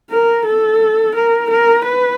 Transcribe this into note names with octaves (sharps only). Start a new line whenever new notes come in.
A#4
A4
A#4
A#4
B4